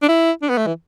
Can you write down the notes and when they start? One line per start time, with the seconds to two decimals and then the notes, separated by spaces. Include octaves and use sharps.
0.02 D4
0.08 E4
0.42 D4
0.49 B3
0.57 A3
0.66 E3